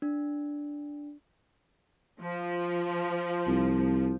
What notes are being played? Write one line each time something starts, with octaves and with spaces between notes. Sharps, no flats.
D4
F3
C2